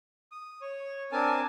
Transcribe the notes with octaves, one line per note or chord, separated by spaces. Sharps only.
D#6
C#5
C4 D4 A#4 G#5 A5